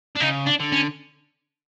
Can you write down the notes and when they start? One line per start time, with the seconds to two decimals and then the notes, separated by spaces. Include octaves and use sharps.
0.17 D4
0.21 C#3 D#4
0.47 D4
0.60 D3
0.72 C#4